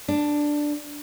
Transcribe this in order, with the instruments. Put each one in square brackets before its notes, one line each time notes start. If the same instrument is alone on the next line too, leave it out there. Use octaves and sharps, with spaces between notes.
[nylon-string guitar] D4